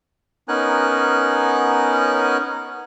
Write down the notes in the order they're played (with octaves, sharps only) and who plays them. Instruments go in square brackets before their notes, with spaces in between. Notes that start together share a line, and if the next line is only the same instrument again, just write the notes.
[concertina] B3 C#4 D#4 A#4 G#5 F#6